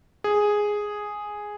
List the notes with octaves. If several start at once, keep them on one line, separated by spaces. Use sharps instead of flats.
G#4